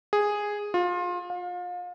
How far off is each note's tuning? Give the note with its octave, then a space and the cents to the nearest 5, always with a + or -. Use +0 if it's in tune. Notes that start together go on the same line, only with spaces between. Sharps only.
G#4 -5
F4 +25
F5 +35